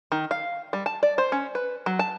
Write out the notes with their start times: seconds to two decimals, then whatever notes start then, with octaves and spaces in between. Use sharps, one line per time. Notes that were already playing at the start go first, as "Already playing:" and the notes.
0.12 D#3
0.31 F5
0.73 G3
0.86 A5
1.03 D5
1.18 C5
1.32 C#4
1.55 B4
1.86 F#3
1.99 A5